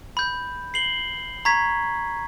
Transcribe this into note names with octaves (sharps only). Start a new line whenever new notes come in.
B5 G6
C7 F#7 G7
A#5 C#6 G#6 B6